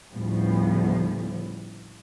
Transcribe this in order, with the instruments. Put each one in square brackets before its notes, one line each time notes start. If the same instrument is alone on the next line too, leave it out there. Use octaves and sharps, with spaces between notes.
[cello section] D2 A2 C#3 F3 G3 B3